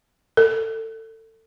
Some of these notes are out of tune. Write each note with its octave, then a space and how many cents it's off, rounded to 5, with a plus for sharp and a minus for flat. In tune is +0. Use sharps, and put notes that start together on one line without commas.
A4 +25